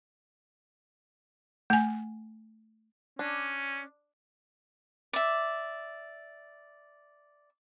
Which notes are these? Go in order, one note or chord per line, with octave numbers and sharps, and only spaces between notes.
A3 G#5
C#4 D4
D5 E5